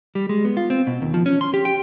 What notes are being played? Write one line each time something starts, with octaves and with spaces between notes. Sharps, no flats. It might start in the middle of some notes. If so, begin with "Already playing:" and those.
G3
G#3
B3
F4
C4
B2
D#2
F3
C#4
C6
G4
G5